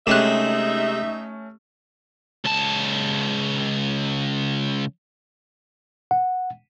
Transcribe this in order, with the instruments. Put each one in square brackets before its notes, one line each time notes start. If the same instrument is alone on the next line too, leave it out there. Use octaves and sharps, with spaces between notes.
[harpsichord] C3 G#3 [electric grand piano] A3 C#4 [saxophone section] D#4 E5 [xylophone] G4 F#6
[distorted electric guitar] C#2 A5
[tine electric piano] F#5